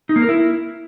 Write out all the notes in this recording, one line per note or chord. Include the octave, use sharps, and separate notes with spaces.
D#4
A#3
A#4
E4